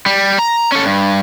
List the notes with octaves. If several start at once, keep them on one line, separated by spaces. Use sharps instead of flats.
G3
A#5
C#4 A4
G2